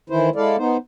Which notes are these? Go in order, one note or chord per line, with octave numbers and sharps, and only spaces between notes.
D#3 E3 E4 C5
G#3 E4 A4 D5 F5
B3 D#4 C5